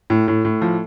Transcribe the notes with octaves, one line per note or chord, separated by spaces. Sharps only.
A2
A2
A2
F3